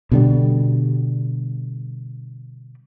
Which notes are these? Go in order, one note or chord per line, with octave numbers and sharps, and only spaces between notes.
B2 D3 G3